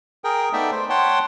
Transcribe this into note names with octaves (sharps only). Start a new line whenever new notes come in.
G#4 A#4 G5
A3 B3 D#4 D5 E5 G5
C5
C#5 F#5 G5 A5 C6